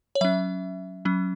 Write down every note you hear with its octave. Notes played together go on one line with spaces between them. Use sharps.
C#5
F#3 C#4 E5
F#3 C#4